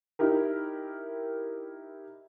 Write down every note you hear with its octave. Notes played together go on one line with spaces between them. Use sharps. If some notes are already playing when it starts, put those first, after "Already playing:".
D#4 E4 G4 A#4